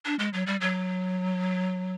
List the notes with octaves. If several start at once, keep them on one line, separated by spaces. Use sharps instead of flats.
D4
G#3
F#3
G3
F#3